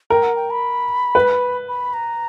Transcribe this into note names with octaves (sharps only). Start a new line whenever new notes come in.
A#4 G5
F#5
G5
B5
B4
B5
A#5